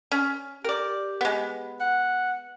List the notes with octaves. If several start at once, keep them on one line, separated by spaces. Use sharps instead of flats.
C#4
G4 A#4 D5
G#3 B3
F#5